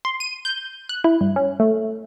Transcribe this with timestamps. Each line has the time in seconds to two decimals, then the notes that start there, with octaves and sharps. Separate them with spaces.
0.05 C6
0.20 D#7
0.45 G6
0.89 F#6
1.04 E4
1.21 G2
1.36 C#4
1.60 A3